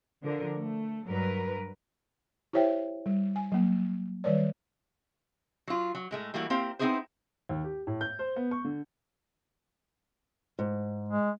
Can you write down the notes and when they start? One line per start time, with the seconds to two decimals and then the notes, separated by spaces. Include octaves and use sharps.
0.23 D3 F3 A#4
0.58 A3
1.07 G2 F#3 A#4 B4
2.53 E4 G4 C5 C#5 E5 G5
3.06 G3
3.36 G#5
3.52 F#3 A#3
4.24 D#3 G3 B4 C#5 D5
5.68 F#3 F4
5.95 F#3
6.11 A2 G#3 A3
6.34 E3 G3 A3 A#3 E4 F#4
6.50 A#3 C4 E4 G4 C5 F5
6.79 B3 C4 D#4 E4 G#4 C5
7.49 D#2
7.64 G4
7.87 A2
8.01 G6
8.19 C5
8.36 B3
8.51 C#6
8.65 D3
10.59 G#2
11.09 G#3